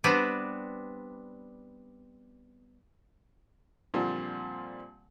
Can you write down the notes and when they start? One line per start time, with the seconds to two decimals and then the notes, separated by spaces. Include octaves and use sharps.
0.04 G3 B3 C4 D4
3.94 A#2 D3 F3 G3 C4